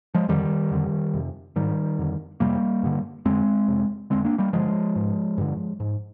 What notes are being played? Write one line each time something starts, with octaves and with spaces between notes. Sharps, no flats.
F3 G#3
F2 D3 D#3 G3
F2 D3
F2 C3
G#2 D#3 G3
F2 D3
F2 C3 G3 A#3
G2 D3
F2 D3 G#3 C4
F2 C3
F2 D3 G#3 C4
A#3 D4
G3 A#3
G2 D3 F3 G#3
G#2
G2 D3
G#2